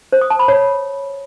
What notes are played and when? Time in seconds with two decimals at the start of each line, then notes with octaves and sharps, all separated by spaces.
0.13 C5
0.21 D#6
0.30 A5
0.39 B5
0.48 C#5